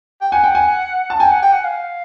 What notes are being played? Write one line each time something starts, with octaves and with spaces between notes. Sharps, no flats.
G5
F#5 G#5
G5
G#5
A5
G5 G#5
F#5
G5
F#5
F5